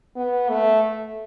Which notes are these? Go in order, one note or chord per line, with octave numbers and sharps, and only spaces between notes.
B3
A3